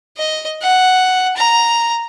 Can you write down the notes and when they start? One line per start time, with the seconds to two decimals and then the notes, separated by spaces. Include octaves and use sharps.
0.17 D#5
0.62 F#5
1.37 A#5